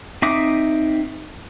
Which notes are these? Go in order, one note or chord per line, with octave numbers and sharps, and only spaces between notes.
C4 D#4 E5 D6 D#6